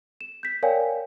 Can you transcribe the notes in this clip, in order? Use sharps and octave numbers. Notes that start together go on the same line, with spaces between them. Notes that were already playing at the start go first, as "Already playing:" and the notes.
E7
G6 B6
A#4 C#5 D5 F5 G5 G#5